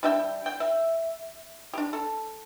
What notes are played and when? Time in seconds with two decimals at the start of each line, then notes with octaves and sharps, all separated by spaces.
0.03 G3 D4 E5 G5
0.46 G5
0.60 E5
1.74 D4 G4
1.93 A4